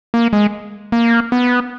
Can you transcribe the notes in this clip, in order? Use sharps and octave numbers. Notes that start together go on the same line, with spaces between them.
A#3
G#3
A#3
B3